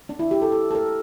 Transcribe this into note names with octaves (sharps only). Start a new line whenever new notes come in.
D4
E4
G4
A4
A4
A4
A#4